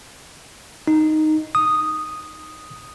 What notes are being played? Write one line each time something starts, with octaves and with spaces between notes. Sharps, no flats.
D#4
D#6